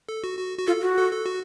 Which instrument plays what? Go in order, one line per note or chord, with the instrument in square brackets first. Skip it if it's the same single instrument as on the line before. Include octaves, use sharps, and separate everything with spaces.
[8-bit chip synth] A4
F#4
F#4
F#4
[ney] F4 [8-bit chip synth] A4
[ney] F#4
[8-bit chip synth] A4
A4
F#4